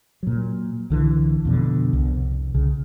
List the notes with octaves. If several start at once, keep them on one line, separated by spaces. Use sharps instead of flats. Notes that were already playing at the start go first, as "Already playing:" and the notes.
A#2 F#3
C2 D3 E3
F2 B2 D3
C2
C2 C#3